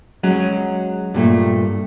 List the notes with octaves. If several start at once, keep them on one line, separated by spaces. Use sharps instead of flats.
F#3 G#3 C#4
G2 A#2 A3